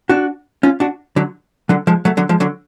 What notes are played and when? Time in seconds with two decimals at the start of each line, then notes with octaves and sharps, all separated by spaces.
0.09 D4 F#4
0.63 C#4 F4
0.80 D4 F#4
1.16 D3 F#3
1.69 D3 F#3
1.87 F3 G#3
2.05 F#3 A3
2.17 D3 F#3
2.29 F3 G#3
2.40 D3 F#3